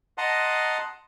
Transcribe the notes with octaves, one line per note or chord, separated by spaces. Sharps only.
D#5 F#5 A5 A#5 C6 D#6